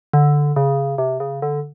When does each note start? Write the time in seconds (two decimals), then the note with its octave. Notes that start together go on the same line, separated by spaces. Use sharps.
0.13 D3
0.56 C#3
0.98 C3
1.20 C#3
1.42 D3